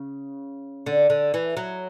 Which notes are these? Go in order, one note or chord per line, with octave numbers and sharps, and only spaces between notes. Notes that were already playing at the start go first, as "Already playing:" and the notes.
Already playing: C#3
D3
D3
E3
F#3